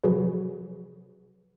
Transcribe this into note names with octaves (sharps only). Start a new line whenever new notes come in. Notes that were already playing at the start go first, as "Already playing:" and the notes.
C3 F3 F#3 F#4 G#4 B4